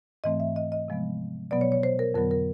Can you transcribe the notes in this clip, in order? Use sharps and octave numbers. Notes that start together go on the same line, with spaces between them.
G#2 E3 A3 C4 D#5
E5
D#5
D#5
C3 F3 G#3 B3
B2 F#3 B3 D5
C#5
C#5
C5
A#4
F2 D3 F#3 B3 A#4
A#4